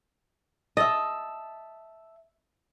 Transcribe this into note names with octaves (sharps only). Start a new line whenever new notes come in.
D#5 E5 A5